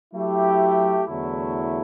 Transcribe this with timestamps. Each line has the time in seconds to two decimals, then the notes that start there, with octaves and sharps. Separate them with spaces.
0.13 F#3 A3 E4 G4
1.06 E2 D3 F#3 A3 E4